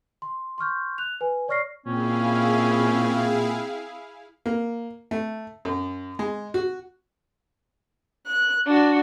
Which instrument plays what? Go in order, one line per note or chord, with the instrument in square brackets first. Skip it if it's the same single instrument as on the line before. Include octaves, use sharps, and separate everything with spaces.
[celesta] C6
C6 C#6 F6 G6
F#6 F7
B4 G#5
C#5 D5 C#6 F6 A#6 C7
[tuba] A#2 [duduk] C4 [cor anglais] C#4 [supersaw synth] E4 G#4 F5
[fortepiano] A#3
A3
F#2
G#3
F#4
[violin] F#6
D4 F#4